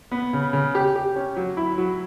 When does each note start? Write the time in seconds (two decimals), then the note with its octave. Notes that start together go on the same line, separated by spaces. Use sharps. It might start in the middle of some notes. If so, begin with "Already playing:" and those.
0.11 B3
0.33 C#3
0.53 C#3
0.75 G4
0.96 G4
1.16 C#4
1.36 F#3
1.57 E4
1.78 F#3